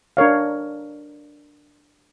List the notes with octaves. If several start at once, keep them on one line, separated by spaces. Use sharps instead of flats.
D4 A#4 C#5 F5